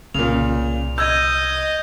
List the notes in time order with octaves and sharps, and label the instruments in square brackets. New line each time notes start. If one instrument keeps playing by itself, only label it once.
[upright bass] C2 D4 [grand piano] A#2 C#3 [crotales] F7
[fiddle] D#5 [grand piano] E6 [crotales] G6 G#6 D#7